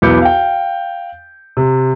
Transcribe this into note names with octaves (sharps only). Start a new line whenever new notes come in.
B1 E2 B4 D6 G6 C#7
F5 G5
C3